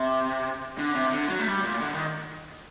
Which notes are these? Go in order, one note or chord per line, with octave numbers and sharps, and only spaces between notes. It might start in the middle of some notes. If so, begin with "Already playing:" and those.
Already playing: C3
D3
C3
D3
F#3
A3
G3
A#2
D3
D#3